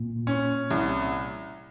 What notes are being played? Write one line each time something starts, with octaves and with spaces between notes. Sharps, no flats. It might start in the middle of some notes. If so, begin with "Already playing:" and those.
Already playing: A#2
C#4
C2